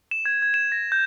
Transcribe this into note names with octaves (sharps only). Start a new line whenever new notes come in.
E7
G#6
G#6
E7
A#6
G6